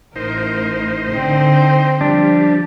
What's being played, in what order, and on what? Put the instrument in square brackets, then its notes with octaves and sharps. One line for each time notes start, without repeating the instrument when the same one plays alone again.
[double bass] A1 [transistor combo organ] D#4 C5 [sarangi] A#4
[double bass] D3 [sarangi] C4
[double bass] F3 [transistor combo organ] G3 [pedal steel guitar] D4